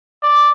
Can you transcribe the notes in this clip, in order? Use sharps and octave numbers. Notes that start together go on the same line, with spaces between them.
D5